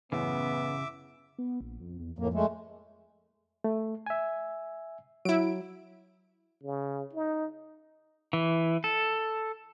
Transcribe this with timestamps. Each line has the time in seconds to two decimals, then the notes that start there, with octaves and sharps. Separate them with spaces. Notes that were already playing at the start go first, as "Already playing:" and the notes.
0.12 A1 F#2 C#3 B3 E5 D6
1.39 B3
1.61 A#1
1.80 F2
1.99 E2
2.19 F2 A2 A#3
2.34 G#3 A3
3.64 A3
4.06 E5 G#5
5.25 F#3 E4 D7
6.63 C#3
7.13 D#4
8.33 E3
8.84 A4